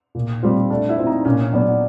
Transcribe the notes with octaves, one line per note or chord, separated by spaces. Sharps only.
A#2
G3 C4 F4
A3 D4
E4
C4 F4
D#4
A#2 C#4
F#3 B3 D4